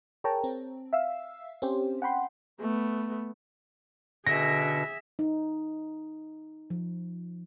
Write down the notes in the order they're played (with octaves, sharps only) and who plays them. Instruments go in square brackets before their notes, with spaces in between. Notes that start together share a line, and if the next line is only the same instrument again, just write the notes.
[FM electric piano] G#4 A#4 C#5 G5 A5 A#5
C4
E5 F5 E6
C4 C#4 G4 C5
F#5 G5 B5 C6
[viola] A3 B3
[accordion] B2 [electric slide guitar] D3 [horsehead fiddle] G#4 E5 [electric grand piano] A#6
[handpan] D#4
F3